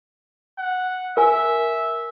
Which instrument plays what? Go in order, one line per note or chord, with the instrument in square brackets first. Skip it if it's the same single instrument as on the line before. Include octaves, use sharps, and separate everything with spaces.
[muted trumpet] F#5
[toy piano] A#4 G#5 [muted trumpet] E5